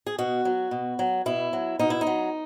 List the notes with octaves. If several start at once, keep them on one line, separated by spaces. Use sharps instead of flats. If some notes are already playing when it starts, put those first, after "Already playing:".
G#4
B2 F#4
F#3
B2
F#3
B2 E4
F#3
B2 D#4
E4
D#4
F#3